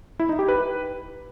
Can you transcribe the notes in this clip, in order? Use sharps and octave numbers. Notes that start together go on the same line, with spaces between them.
E4
D#4
G4
B4